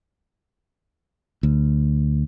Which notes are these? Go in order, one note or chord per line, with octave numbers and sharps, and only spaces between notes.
D2